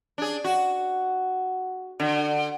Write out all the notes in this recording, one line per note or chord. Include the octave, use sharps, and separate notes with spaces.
D4 G#4
F#4
D3